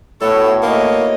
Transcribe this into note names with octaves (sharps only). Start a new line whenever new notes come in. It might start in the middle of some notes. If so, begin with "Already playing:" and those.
A2 A3 B3 F#4 A4 C#5
A#3 D#4 C#5 D#5